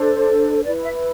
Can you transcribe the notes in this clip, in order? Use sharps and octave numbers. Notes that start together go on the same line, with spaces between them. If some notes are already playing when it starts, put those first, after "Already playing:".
Already playing: D4 A4 C5
E4 B4 D5
E5